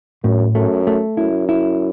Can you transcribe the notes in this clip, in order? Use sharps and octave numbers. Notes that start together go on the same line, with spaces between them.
F#2 A2
F#2 A3
A3
F#2 E4
E4